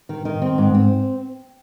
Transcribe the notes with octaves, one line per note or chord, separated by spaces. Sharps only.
D#3
D#3
C4
G#2
C4